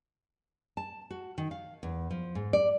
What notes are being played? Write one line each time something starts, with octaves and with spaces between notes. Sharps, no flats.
A5
F#4
D#3
F5
E2
F3
G#2
D5